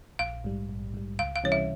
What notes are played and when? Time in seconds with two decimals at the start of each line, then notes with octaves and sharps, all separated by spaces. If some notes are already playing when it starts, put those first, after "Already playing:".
0.19 A#1 F5
0.44 G#2 G3
0.69 A#1
0.94 G#2 G3
1.19 C#2 F5
1.36 F5
1.44 C3 E3 G3 C#4 C#5
1.52 E5